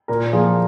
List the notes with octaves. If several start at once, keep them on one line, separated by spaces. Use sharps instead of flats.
A#2 A#4
F3 A#3 F4 G#4